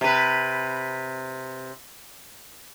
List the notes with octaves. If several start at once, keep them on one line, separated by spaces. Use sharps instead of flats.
C3 B4